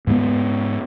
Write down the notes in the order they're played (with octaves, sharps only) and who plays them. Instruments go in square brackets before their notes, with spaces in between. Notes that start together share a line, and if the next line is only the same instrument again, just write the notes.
[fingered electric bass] G#2 G#3 A#3 B3